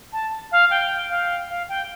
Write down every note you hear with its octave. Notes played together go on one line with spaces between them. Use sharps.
A5
F5
G5
F5
F5
G5